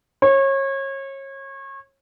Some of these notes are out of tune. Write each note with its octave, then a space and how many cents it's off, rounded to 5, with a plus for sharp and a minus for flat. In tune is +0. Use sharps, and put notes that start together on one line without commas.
C#5 -30